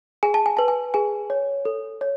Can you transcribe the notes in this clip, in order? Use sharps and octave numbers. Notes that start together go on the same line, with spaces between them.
G#4 G#5
A5
G#5
B4 A5
G#5
G#4 G#5
C#5
A4
C#5